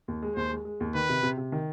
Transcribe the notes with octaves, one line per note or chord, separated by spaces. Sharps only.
D#2
G#3
D#2 C5
G#3
G#3
D#2
D#3 B4
C3
C3
C3
D#3